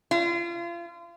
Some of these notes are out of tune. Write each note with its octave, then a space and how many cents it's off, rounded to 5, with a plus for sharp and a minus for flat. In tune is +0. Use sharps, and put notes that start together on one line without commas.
F4 -35